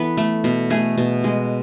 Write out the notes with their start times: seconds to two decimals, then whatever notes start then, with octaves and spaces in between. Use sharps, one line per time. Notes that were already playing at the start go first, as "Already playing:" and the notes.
Already playing: E3 B3 A4 B4
0.17 A3
0.44 B2
0.70 A3 G#4
0.98 B2
1.24 G#3